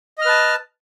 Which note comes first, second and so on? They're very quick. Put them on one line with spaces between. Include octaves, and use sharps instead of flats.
D#5 F6 B4 A5